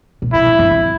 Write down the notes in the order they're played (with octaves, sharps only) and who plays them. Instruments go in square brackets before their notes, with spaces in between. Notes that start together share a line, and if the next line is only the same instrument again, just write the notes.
[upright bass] A#2
[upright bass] B2 [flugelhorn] E4
[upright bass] G2
G2
E2